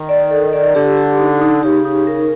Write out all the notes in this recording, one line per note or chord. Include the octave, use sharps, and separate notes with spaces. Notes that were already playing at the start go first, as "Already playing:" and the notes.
Already playing: D#3
D5
A4
D5
D3 G4
G4
D#4
D#4
C#3 G4
D#4
A#4